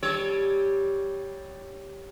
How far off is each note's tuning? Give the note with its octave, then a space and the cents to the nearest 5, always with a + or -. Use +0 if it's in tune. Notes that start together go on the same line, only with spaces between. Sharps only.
G3 +0 A4 -30 C#5 +0